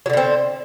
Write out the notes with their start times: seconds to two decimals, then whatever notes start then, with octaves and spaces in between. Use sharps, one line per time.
0.06 F#3
0.10 D3
0.13 B2
0.17 C4